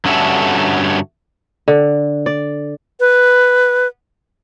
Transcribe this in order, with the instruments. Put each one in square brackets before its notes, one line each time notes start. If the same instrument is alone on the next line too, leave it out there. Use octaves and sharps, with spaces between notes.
[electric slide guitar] G2 D3 C#4 F#4 A4 E5
[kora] D3
D5
[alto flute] B4